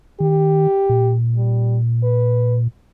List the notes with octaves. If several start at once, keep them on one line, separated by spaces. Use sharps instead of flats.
D#3 G4
A#2
G3
B4